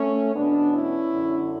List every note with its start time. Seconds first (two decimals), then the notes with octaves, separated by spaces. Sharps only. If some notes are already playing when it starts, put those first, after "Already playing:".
Already playing: A3 C#4
0.34 E2 B2 B3 D4
0.73 C#4 E4
1.12 F#2 D3